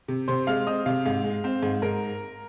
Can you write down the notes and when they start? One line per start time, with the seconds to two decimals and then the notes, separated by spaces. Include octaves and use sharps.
0.08 C3
0.28 C3 C5 C6
0.47 G#3 F5 F6
0.67 C4 D#5 D#6
0.86 C3 F5
1.05 G#2 F5
1.24 G#3
1.44 C4
1.63 G#2
1.82 G#2 A#4 A#5